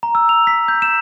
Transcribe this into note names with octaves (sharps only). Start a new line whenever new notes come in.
A#5
E6
F7
B6
G6
E7